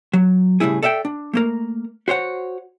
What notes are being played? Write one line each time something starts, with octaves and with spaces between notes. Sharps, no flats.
F#3
A2 C#3 G3 E4 G#4
A4 D5 E5 F5 G5
D4
A3 A#3 A#4
F#4 C5 C#5 F#5